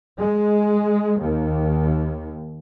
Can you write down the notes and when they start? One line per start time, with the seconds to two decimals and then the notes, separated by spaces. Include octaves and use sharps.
0.18 G#3
1.20 D#2